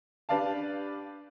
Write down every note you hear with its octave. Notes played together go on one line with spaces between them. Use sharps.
D4 G4 B4 D5 F5 A5